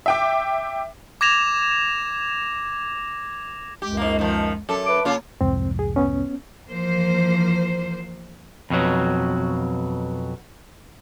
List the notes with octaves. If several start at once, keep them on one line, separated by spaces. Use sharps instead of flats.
E5 G5 D6
D6 G#6 A#6 E7 F7
C#2 F#2 G#3 G4
G#2 A#3
D#3 F3
F#2 A4
B4 E5 D6
C#3 A#3 F4
C2 F2 G#2 C4
G#4
B3 C#4
E3 F3 A#3 C5
F2 B2 F#3